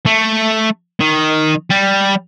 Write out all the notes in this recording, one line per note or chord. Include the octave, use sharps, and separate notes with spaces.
A3
D#3
G3